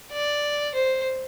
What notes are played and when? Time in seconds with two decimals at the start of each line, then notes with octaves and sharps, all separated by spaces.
0.12 D5
0.75 C5